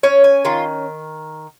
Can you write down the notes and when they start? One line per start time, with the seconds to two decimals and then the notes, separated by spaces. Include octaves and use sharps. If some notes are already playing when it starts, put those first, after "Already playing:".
0.03 C#4 C#5
0.24 G#5
0.45 D#3 F4